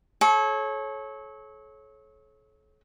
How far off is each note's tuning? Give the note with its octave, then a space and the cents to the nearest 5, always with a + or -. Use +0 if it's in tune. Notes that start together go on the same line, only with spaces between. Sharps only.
A4 -40 C#5 -20